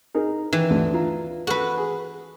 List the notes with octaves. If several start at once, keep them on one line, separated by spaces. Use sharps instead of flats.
D#4 G#4 A#4
D#3 E3
D2 D3
F4 A#5
F#4 A4 B4
G#4